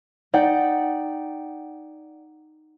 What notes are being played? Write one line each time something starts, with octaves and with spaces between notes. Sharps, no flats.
D#4 D5 F#5 G5